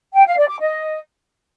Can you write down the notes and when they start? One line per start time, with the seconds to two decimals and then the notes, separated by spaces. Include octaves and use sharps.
0.13 G5
0.25 F5
0.37 D5
0.48 D6
0.60 D#5